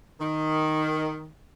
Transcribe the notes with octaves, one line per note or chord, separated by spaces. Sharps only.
D#3